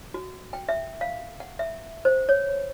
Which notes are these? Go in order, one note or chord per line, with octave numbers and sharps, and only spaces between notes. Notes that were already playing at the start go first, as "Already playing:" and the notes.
F#4
G5
E5
F5
F#5
E5
C5
C#5